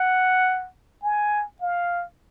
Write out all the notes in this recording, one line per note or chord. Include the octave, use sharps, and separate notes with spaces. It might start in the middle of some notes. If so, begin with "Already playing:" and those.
Already playing: F#5
G#5
F5